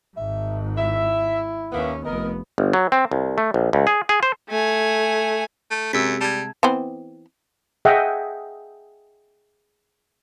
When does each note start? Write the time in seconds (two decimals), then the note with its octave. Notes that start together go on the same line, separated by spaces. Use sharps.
0.17 G#1 G#2 E5
0.78 E4 E5
1.72 D#2 A#3 B3 C#4 E5
2.05 F1 B3 A#4 D#5
2.58 G1
2.73 F#3
2.92 C4
3.11 C2
3.38 A3
3.54 A#1
3.73 C#2
3.87 G#4
4.09 G#4
4.23 C5
4.49 A3 G#5
5.71 A3
5.93 F#2 C3 G#3 E6 B6
6.21 G3 A5 G#6
6.63 E3 B3 C4
7.85 G#4 D#5 E5 F#5 G5